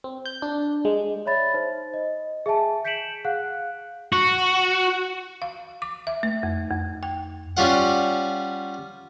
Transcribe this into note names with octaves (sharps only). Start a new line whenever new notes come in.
C4
G6
D4
G#3
C#5 D5 E5 B5 A6
D#4 C5
D#5
G#4 E5 G#5 A5
G6 B6 C#7 D7 E7 F#7
G#4 F5 F#5 F#6
F#4
F5
D6
E5
A3
F2
F2
G5
G3 C#4 F4 F#5